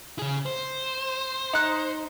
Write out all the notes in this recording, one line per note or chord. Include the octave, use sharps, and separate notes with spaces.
C#3 G#4
C5
D#4 F#6